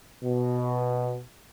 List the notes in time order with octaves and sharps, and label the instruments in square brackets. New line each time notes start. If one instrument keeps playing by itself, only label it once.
[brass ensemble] B2